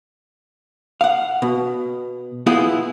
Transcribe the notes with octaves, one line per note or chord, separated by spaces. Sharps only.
F5 F#5
B2
B3 E4 F4 G#4